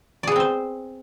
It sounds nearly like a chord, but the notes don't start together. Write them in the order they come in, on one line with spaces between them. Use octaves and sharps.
D5 G#4 B3 C4 C5